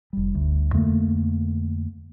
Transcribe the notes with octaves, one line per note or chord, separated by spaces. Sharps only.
F1 G3
D2
F2 D3 A3 A#3